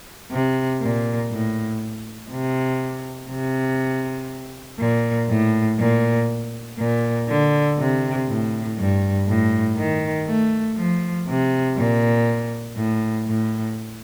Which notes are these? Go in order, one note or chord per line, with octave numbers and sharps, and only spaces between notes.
C3
A#2
A2
C3
C3
A#2
A2
A#2
A#2
D3
C3
A2
G2
A2
D#3
A3
F3
C3
A#2
A2
A2